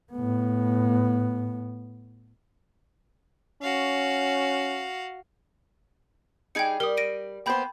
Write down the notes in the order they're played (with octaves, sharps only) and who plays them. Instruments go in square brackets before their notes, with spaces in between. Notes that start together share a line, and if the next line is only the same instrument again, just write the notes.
[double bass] A2 B3
[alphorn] C#4 [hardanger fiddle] F#4 F5
[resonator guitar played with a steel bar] G3 D#4 G#4 [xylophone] G5 G#6 C#7
[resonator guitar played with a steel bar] G3 [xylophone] A#4 D#6
[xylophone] A#6 D7 D#7
[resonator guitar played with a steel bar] A#3 B3 C5 [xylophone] G5 B5 G6